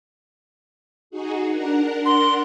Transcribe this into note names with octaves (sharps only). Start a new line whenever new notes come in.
D#4 F#4 G#4
D4 A#4 F#5
C6